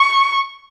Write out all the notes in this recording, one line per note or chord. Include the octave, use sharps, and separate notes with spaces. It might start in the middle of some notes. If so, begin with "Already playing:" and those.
Already playing: C#6